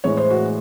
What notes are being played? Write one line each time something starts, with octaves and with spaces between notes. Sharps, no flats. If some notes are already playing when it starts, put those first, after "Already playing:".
A2 E3 G#3 C#5
C5
F#4